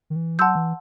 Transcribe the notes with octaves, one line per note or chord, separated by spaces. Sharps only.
D#3
E3
F#3 F#5 A5 C6 E6 G6
E3